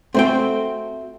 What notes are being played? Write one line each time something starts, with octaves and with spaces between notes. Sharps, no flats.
A3 C4 F#4 C5 G5